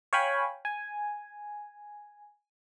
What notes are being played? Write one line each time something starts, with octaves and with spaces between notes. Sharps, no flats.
C#5 F5 G5 G#5 B5
G#5